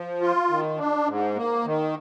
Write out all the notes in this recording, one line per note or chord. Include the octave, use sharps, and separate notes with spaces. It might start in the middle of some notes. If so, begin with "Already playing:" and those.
Already playing: F3
F4
D#3
D4
G#2
A#3
D#3